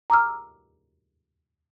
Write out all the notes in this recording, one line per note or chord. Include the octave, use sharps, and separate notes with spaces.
A#5 D6 E6 F6